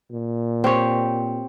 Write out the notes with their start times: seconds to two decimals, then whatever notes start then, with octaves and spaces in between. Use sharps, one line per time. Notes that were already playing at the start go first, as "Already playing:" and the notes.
0.12 A#2
0.64 C4 G4 C#5